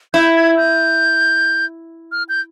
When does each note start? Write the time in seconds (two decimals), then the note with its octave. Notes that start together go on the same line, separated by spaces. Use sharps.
0.14 E4 G6
0.36 G#6
0.57 G6
2.12 F6
2.29 G6